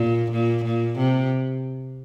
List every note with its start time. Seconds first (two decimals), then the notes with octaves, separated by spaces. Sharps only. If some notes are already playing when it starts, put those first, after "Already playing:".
Already playing: A#2
0.31 A#2
0.65 A#2
0.98 C3